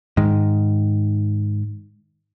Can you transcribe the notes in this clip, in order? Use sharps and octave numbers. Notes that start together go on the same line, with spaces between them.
G#2 D#3